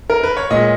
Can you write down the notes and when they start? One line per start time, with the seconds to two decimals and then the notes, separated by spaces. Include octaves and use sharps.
0.10 A#4
0.23 B4
0.37 C#5
0.51 A#2 G#3 D#5